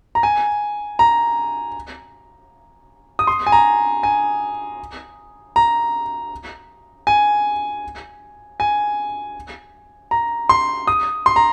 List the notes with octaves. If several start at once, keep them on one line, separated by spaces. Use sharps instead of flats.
A#5
G#5
A#5
D#6
C6
G#5
A#5
G#5
A#5
G#5
G#5
A#5
C6
D#6
C6
A#5